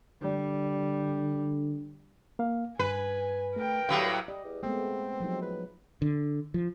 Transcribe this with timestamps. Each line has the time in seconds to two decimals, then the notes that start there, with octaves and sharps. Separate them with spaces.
0.21 D3 G3
2.39 A#3 F5
2.79 G2 B4 G#5
3.56 A3 A#4 G5
3.89 A2 F#3 G3 F5
4.28 G3 G4 D#5
4.44 E2
4.63 G#3 A3 B3 C4
5.20 F3 F#3 D#4
5.42 B4
6.02 D3
6.54 F3